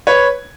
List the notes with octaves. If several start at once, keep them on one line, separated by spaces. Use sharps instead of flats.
B4 C#5